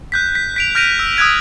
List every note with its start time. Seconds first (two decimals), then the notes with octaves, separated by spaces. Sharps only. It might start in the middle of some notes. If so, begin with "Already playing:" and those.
0.12 F#6 G6 B6
0.35 B6
0.56 B6 D7 F7
0.75 F6 G6 A#6 D7 D#7 F7
0.99 E6
1.17 D#6 E6 F#6 G#6 D7